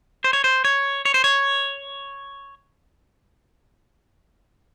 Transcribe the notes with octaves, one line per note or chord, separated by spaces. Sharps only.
C5
C#5
C5
C#5
C#5
C5
C#5